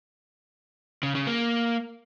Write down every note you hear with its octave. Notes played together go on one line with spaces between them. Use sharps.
C#3
C#3
A#3